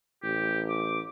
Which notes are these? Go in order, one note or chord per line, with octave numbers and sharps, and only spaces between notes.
A1 G4
D6